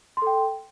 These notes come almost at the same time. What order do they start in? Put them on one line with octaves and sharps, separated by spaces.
C6 A4 G5